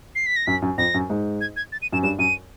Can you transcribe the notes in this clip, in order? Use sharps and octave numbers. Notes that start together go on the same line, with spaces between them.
C7
B6
A#6
F#2 B6
F#2
F2 A#6
F#2
G#2
G#6
G#6
A6
D#7
F#2 E7
G2 E7
F#2 D#7